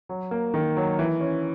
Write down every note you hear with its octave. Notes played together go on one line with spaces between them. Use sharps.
F#3
A#3
D#3
F#3
E3
C#4